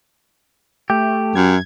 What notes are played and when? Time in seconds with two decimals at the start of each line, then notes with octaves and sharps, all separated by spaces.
0.90 A3 G4
1.35 F#2 G#6